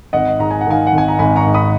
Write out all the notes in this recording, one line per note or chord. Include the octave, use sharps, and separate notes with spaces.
G#1 D#5 F#5
G#2 A#5
G#5
F#5
D#3 F5 G#5
F#5
G#1 G#5
A#5
G#1 G#5 B5
A#5 C#6
G#2
B5 D#6